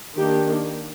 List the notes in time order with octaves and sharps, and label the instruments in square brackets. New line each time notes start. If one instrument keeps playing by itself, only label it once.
[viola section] D#3 A#3 D4 G4